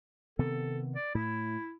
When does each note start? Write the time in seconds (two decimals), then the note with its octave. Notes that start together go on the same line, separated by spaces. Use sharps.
0.39 C3 D#3 B3 A4
0.96 D5
1.15 A2 E4